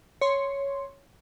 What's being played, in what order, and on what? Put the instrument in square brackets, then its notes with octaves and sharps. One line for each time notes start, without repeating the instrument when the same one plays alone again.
[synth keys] C#5 C6